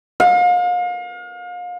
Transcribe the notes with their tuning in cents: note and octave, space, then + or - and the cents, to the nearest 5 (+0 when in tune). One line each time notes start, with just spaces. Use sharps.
F5 +35